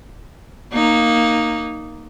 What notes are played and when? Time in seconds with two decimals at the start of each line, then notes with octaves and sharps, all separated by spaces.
0.73 A#3 D#4